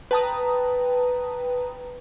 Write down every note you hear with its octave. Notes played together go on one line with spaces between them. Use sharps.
B4 G5 A5 A#5 D#6